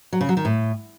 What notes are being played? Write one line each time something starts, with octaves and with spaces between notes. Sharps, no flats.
F#3
C#3
F#3
D#3
A2